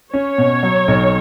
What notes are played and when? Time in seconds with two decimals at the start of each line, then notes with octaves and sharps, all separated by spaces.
0.14 C#4 C#5
0.38 B2
0.63 F#3
0.88 B1